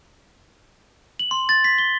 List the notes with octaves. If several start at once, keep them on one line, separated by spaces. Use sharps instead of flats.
F#7
C6
A6
B6
G7